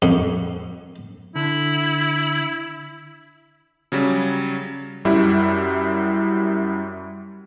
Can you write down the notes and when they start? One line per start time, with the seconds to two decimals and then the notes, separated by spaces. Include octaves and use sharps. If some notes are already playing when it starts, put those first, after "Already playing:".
0.02 F2
1.36 D3 E4
3.92 C#3 F#3 G3
5.05 F#2 G3 E4